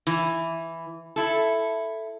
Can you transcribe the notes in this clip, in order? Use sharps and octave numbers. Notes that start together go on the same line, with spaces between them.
E3
E4 A4